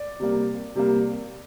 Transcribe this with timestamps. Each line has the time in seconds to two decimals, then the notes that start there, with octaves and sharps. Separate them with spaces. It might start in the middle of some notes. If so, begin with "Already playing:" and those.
Already playing: D5
0.20 C3 G3 A#3
0.75 C3 G3 A#3